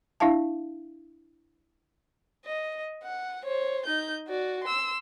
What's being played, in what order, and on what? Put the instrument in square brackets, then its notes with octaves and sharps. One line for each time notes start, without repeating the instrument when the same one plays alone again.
[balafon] D4 E4 E5 F5 A5
[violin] D#5
F#5
C5 C#5
D#4 G6
F#4 D5
C6 E6